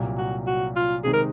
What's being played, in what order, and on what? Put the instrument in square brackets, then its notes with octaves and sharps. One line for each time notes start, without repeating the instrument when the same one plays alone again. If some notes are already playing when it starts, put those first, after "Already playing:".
Already playing: [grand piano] C2 A#2 F#3
[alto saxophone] F#4
F#4
F4
[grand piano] C3 D#3 G#3 [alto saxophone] G#4
[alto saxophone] A#4